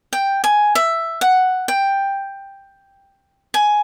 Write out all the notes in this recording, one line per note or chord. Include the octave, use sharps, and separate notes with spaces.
G5
G#5
E5
F#5
G5
G#5